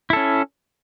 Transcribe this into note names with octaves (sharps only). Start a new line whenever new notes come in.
C#4 E4 A4